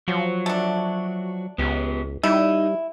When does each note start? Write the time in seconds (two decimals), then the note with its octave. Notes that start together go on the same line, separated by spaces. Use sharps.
0.08 F3 F#3 F#4
0.46 A3 D4
1.58 C#2 B3 G4
2.23 G3 D#4 E4